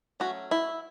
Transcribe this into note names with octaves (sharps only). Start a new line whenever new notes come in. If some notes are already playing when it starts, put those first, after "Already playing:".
F#3 A3 C#4 F#4
E4